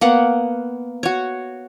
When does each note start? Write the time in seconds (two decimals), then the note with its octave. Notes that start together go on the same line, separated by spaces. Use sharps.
0.01 A#3 B3 F#5
1.03 F#4 C#5